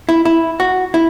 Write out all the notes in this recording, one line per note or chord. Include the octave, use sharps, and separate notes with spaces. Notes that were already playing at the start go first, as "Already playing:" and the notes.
E4
E4
F#4
E4